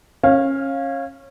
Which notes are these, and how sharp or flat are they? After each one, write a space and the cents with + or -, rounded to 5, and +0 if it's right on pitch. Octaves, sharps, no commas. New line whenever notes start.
C#4 -25 F5 +0